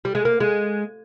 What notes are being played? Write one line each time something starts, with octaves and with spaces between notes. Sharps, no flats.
G3
G#3
A#3
G#3